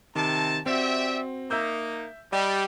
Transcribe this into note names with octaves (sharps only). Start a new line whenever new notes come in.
C3 D#3 A5
C4 F#4 G4 D5 E5
A#3 D#4 E5 E6 G6
G3 D5 D#5 G5